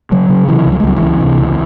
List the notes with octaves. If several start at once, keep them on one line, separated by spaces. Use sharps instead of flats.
C#3 F#3
C#3
C3 E3
C#2
F#3
G#3
C#2 F#3
E3
C#2
C3
C#2